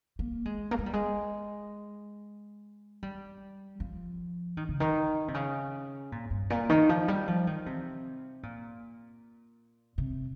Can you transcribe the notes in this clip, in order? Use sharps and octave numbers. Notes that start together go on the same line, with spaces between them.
A#3
G#3
A#3
G#3
G3
G#3
G3
F3
D#3
C#3
D#3
C3
C#3
A#2
G2
A#2
D#3
F3
G3
F3
D#3
C3
A#2
C3